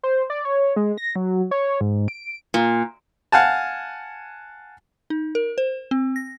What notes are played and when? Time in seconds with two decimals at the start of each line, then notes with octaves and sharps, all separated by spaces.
0.03 C5
0.30 D5
0.45 C#5
0.76 G#3
0.98 A#6
1.16 F#3
1.51 C#5
1.81 G#2
2.08 D7
2.54 A#2
3.32 F5 F#5 G#5 A5
5.10 D#4
5.35 A#4
5.58 C5
5.91 C4
6.16 A#6